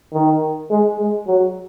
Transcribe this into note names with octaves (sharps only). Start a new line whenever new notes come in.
D#3
G#3
G#3
F#3